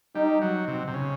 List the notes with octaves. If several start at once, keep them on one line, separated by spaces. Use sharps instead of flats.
G3 D#4
F#3
C3
C3
C#3